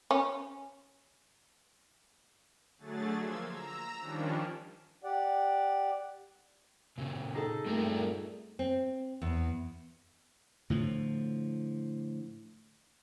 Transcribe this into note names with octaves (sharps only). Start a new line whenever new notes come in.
C#4
D3 F#3 A3 G#4 A6
F3 A#3 C6 E6 G#6
A#5 E6
D#3 F3 G3 C#4 D4
G4 D5 F#5
A#2 C#3
D#4 G#4 A4
G2 A#2 G3 A3 C4 A#4
C4
E2
A2 D3 F3